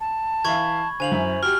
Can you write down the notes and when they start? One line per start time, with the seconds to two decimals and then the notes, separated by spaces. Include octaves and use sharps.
0.01 A5
0.45 E3 E5 F5 B5 C#6 G#6
1.00 D3 C5 F5 G#5 F7 F#7
1.11 F#2 E4 E5
1.43 F#4 G4 F6